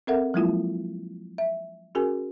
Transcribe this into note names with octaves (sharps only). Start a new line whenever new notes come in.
C4 A4 A#4 E5 F#5
F3 F#3 G#3 A#3 E4 F4
E5
C#4 F#4 G#4 A#4 G#5